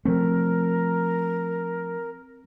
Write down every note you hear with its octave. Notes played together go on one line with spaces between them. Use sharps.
F3 A3 C4 A#4